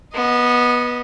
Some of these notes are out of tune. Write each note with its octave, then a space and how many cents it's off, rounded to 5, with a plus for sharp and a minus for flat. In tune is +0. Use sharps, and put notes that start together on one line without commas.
B3 -15 D#5 +10